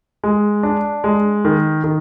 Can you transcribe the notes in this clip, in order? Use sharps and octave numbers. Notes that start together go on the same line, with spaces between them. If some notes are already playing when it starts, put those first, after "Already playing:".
G#3
D4
G#3
D#3
D#3